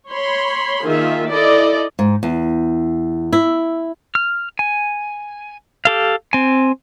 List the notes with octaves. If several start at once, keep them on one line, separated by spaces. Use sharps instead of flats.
C#5 B5 C6
D#3 A#3 F4 G#4 E5
E4 A4 D5 D#5
G#2
E2
E4
F6
G#5
G4 A4 F5
C4 G#5